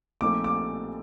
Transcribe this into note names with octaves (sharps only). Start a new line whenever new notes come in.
A#1 A#2 A3 C4 D#4 D6
D6